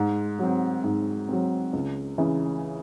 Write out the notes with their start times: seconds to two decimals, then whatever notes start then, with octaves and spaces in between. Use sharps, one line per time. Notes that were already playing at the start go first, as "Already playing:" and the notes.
Already playing: G#2
0.39 F#3 C4
0.84 G#2
1.29 F#3 C4
1.73 C#2
2.18 C#3 E3